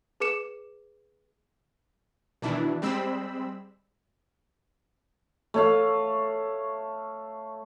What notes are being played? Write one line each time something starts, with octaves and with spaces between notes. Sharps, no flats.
G#4 B4 D6 C#7 E7
B2 D#3 E3 D4 E4
G3 G#3 C4 B5 E6
A3 C#5 F5